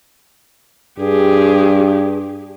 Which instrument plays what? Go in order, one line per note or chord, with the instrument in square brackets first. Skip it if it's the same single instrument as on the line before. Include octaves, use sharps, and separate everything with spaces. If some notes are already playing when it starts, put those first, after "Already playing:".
[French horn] G2 [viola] G4 G#4